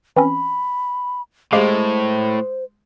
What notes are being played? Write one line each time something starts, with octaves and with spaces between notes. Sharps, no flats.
E3 C4 C#4 B5
A2 G#3 G4 C5 F5